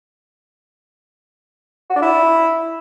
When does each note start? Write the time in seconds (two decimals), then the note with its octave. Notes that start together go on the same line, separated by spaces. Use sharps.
1.90 F#4
1.96 D4
2.02 E4